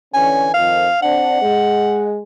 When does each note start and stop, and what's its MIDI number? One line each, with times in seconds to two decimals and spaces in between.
0.14 0.49 50
0.14 0.49 52
0.14 0.49 61
0.14 0.54 80
0.54 0.87 41
0.54 0.87 51
0.54 0.98 77
1.02 1.37 60
1.02 1.37 62
1.02 2.11 78
1.41 2.20 56